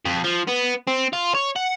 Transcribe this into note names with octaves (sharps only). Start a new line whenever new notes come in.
F2
F3
B3
C4
F4
C#5
F#5